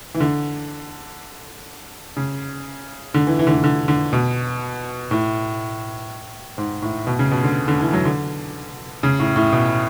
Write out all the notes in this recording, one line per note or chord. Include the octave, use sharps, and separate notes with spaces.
E3
D3
C#3
D3
E3
E3
D3
E3
D3
D3
B2
A2
G#2
A2
B2
C#3
B2
D3
D3
E3
F#3
D3
C#3
A2
A2
B2